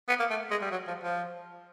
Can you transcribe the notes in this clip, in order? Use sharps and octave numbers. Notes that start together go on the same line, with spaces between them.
B3
A#3
A3
G#3
G3
F#3
F3
F3